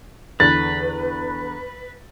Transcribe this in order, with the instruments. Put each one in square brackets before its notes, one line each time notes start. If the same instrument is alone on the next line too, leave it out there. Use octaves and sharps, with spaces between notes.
[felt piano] E2 D3 [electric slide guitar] B4 [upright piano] A6